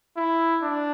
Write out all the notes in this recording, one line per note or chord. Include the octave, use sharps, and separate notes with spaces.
E4
D4